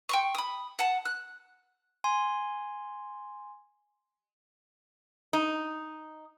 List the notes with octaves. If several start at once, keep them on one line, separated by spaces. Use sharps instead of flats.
G5 C6 C#6
B5 D#6
F#5 A5
F#6
G#5 C6
D#4